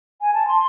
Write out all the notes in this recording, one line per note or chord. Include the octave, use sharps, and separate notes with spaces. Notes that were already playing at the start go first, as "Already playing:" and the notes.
G#5
A5
C6